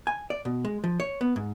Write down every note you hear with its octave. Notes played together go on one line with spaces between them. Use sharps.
G#5
D5
B2
G#3
F3
C#5
B3
G#2